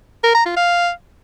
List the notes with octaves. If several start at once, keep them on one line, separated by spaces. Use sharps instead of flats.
A#4
A#5
F4
F5